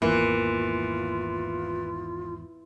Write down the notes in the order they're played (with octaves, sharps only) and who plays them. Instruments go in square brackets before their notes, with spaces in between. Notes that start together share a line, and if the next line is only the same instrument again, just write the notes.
[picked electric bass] G#1 E2 [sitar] E3 [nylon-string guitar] A#3 [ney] F4